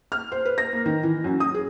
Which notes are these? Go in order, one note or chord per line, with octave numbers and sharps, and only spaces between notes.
F6
C5
B4
A#6
A#3
D#3
E3
F#2
D#6
G#4